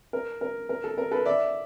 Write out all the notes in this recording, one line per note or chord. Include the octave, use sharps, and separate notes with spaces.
A#4
A#4
A#4
A4
A#4
A4 B4
D5 E5